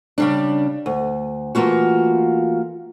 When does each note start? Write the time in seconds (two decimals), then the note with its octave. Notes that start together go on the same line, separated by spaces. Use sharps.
0.18 C#3 G3 D4
0.86 D2
1.55 E3 A3 A#3 F4 F#4